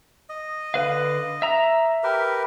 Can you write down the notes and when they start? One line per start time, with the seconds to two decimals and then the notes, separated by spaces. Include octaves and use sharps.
0.29 D#5
0.74 D3 B4 F5
1.42 E5 A#5
2.03 G4 A#4 B4